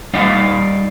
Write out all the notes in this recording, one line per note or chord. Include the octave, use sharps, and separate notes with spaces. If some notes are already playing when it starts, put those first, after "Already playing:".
G3 D#4 D5 D#5 F5